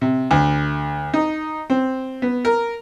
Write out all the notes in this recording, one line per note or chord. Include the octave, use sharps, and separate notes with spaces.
C3
D2
D#4
C4
B3
A#4